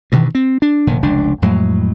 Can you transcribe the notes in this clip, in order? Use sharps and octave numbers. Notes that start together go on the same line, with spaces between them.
G2 B2 D#3 E3
C4
D4
F1 A#2 D3 D#3
F1 C#2 D4
F2 A2 F#3 G#3